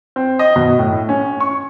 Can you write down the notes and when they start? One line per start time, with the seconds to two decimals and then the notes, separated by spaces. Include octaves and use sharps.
0.16 C4
0.39 D#5
0.56 B2
0.79 A2
1.09 C#4
1.40 C#6